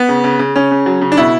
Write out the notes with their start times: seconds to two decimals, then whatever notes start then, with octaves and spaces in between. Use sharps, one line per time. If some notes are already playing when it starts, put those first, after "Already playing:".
Already playing: B3
0.09 C#3
0.24 C#3
0.39 C#3
0.56 C#3 C#4
0.71 C#3
0.86 F#3
1.01 C#3
1.12 D4
1.17 B2 E4